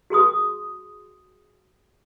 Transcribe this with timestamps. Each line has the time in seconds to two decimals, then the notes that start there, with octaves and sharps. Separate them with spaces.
0.10 F#4 G#4 C6 D#6